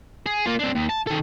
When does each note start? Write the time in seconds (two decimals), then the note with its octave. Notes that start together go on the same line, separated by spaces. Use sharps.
0.26 G#4
0.46 A#3 F4
0.59 C4 D4
0.75 D#2
0.89 A5
1.07 D#3 A4